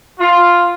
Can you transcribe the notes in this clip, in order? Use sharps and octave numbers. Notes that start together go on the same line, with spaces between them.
F4